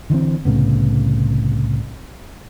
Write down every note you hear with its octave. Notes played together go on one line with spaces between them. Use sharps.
D3 E3 A#3 C4
C2 A2 C#3 B3